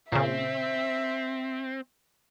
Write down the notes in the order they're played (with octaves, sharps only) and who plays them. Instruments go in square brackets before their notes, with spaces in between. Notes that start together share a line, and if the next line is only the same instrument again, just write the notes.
[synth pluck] A#2 C#3 [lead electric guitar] C4 [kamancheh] E5